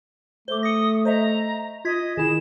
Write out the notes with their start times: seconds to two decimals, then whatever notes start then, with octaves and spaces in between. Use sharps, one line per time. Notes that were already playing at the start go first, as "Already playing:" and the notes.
0.48 A3 C5 D6 G7
0.63 D#6 A#6 C#7
1.05 C5 D#5 E5 A#5
1.85 F4 D#5 G#6 B6
2.17 D#3 E4 G#4 E7